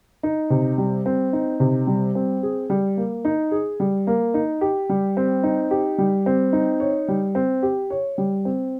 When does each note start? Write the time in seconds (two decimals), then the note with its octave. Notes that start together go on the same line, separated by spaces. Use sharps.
0.23 D#4
0.50 C3
0.78 G3
1.06 C4
1.33 D#4
1.60 C3
1.87 G3
2.15 C4
2.43 G#4
2.70 G3
2.97 A#3
3.25 D#4
3.51 G#4
3.80 G3
4.07 A#3
4.34 D#4
4.61 G4
4.89 G3
5.17 C4
5.43 D#4
5.71 G4
5.98 G3
6.26 C4
6.53 D#4
6.80 C#5
7.08 G3
7.35 C4
7.63 G4
7.90 C#5
8.18 G3
8.45 C4